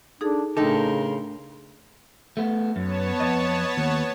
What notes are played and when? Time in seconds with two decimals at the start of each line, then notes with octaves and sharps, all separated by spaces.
0.21 D4 D#4 G#4 A4
0.57 A2 C#3 D4 D#4 A4 A#4 G5 C6
2.37 A3 B3
2.76 F#2 B3 C#5 A5
3.20 F2 D#5
3.77 D#2